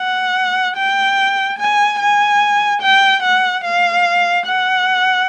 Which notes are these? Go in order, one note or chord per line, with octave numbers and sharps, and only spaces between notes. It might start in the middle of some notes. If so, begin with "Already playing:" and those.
Already playing: F#5
G5
G#5
G#5
G5
F#5
F5
F#5